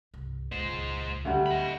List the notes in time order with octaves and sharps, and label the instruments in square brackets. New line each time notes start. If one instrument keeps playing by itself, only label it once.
[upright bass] C2 G2
[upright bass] D#1 C#2 [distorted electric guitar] G#3 C5
[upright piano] D2 G3 [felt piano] E5 F#5
[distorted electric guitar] D#5 B5